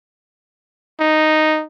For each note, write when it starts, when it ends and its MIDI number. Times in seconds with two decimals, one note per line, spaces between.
1.00 1.64 63